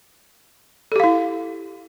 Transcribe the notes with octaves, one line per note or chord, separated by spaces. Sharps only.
E4 G4 A4 F5